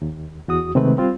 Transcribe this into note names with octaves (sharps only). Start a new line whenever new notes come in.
D#2
E2 F#4 D#6
C3 D#3 G#3 A3 C4 B4
G3 C4 F4